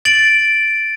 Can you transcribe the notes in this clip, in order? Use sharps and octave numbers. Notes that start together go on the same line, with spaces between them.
A6 D7 F#7